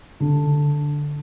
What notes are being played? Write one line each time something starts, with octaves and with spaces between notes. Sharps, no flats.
D3